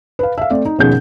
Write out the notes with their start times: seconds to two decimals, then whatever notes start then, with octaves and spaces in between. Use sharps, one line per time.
0.19 B4 F5
0.38 E5 F5
0.50 A3 C4 D5
0.65 D#4
0.78 D#2 B2 F3 C#4 G#4 G6